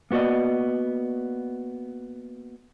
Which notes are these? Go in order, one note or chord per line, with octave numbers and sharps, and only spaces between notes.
A#3 B3 F#4 D5 D#5